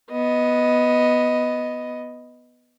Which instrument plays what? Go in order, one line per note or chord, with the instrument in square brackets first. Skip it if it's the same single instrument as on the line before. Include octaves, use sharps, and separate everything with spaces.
[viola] B3 D#5